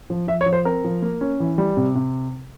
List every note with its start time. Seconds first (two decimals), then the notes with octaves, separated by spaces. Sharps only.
0.10 F3
0.28 F3 E5
0.41 C#5
0.46 F3
0.53 C5
0.65 C4 A#4
0.84 F3
1.02 A#3
1.21 C#4
1.40 E3
1.58 G3
1.77 C3
1.95 C3